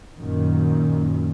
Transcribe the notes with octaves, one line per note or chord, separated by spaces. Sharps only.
F#2 A#2 D#3